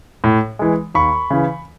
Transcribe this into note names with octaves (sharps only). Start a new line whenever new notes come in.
A2
E3 G#3
D#2 B5 C#6
C#3 E3